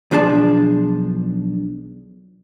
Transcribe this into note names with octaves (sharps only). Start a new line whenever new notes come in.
B1 F3 D4 G#4 A5